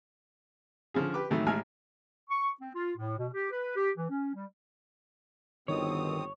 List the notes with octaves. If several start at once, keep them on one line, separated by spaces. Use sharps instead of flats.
D3 F3 C#4 G#4
G4 B4 D6
A2 D#3 E3 F#3 A3
A1 A2 G#3 E5 G#5 F6
C#6
C4
F4
A2
B2
G4
B4
G4
E3
C#4
G3
G1 B2 D#3 C4 C#5 D#6